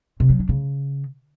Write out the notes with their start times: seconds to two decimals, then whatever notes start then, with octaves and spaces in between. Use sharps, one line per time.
0.20 C3
0.30 F#3
0.39 D4
0.49 C#3